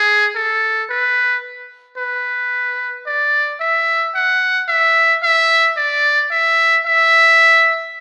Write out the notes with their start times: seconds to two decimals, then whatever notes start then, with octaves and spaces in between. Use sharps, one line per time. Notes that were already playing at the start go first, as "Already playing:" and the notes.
Already playing: G#4
0.35 A4
0.90 B4
1.97 B4
3.06 D5
3.60 E5
4.15 F#5
4.68 E5
5.23 E5
5.77 D5
6.31 E5
6.86 E5